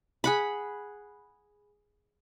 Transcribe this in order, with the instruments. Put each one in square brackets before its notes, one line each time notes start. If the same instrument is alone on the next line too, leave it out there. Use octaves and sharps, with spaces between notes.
[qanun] G#4 F#5 B5